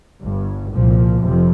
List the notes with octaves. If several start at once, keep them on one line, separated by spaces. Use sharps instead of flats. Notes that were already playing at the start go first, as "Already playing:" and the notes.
G1 G2
C2 A#2 F3
F1 F2 C3 F3